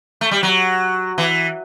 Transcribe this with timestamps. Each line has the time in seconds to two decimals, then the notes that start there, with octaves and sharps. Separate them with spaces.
0.21 A3
0.31 G3
0.43 F#3
1.18 E3